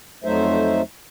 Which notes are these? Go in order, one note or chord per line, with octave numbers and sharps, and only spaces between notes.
F2 F#3 A3 D#4 C5 E5